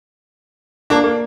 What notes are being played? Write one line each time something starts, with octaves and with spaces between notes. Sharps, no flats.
A#3 D4
A#3